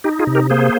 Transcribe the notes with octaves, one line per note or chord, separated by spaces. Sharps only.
D#4 G4
F4 G#4
C3
G4 A#4
A#3 G#4 C5